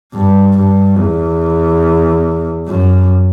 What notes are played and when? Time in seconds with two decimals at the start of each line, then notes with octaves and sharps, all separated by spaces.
0.14 G2
0.56 G2
0.98 E2
2.67 F#2